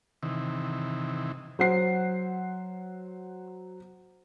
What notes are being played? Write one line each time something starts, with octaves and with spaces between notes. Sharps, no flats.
C3 D#3 E3
F#3 C5 F#5 C7